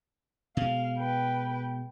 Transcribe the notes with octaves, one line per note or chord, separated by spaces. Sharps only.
B2 G#3 F5
B4 G5